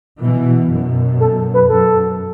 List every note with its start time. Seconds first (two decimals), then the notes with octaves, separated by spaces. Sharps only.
0.22 B2 E3
0.71 F#2 B2
1.20 A4
1.54 B4
1.69 F#2 A4